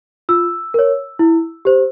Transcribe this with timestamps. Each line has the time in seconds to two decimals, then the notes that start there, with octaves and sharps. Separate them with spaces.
0.29 F4 E6
0.74 A#4 C#5
1.19 E4
1.65 G4 C5